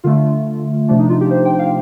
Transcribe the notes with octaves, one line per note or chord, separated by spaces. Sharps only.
D3 A3 F4
C3 F3 A3 D4
D#4
F4
G4
C5
G5
F5